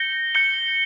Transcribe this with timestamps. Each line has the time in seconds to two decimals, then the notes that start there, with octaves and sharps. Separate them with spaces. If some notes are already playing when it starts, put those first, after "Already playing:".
Already playing: G6 A#6 C#7 G7
0.35 G6 A#6 C#7 G7